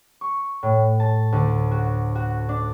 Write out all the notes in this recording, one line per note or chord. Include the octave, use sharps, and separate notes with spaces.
C#6
A2
A5
D2
F#4
F#4
D4